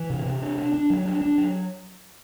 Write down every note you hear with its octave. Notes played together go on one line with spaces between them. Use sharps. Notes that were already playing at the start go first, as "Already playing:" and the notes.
Already playing: E3
C3
C3
D4
D4
D4
F#3
D4
D4
F#3